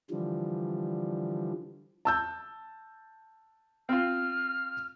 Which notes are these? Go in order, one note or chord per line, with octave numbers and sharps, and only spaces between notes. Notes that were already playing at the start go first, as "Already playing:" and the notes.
D3 E3 F3 G3
A5 E6 G6
C4 F4 F6